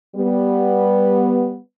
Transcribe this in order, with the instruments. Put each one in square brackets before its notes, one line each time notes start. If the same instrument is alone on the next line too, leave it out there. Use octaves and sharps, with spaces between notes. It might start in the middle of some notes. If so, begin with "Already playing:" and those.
[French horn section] G3 B3